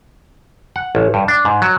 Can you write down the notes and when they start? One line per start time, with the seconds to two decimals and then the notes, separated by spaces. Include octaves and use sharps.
0.76 F#5
0.95 A1
1.14 G2
1.28 D4
1.45 G#2
1.62 F#3